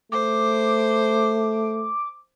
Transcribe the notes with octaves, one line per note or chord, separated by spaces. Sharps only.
A3 C5 D6